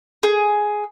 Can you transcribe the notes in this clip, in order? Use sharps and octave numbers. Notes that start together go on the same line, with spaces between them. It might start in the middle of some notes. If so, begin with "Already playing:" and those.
G#4